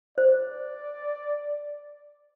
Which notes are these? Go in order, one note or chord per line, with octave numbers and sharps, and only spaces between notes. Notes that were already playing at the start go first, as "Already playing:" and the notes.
C5 D5